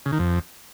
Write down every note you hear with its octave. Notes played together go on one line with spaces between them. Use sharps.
C#3
D#3
F2